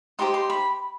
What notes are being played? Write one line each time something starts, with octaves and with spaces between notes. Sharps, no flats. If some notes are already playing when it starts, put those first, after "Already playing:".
D#4 G4 C5 C6
C6
B5